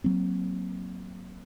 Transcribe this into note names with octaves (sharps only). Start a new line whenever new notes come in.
F#3 A#3 C4